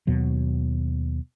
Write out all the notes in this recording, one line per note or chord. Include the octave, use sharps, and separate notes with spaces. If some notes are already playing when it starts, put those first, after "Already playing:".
D#2 B2 F#3